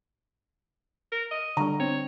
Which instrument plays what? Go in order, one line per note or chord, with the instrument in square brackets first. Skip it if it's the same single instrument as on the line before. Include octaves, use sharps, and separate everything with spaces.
[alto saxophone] A#4
D#5
[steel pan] D3 G3 [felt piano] A#5
[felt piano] C4 [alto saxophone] C#5